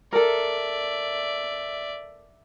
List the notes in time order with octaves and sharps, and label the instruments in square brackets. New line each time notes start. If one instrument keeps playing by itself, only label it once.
[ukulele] A4 A#4 [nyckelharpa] D5 E5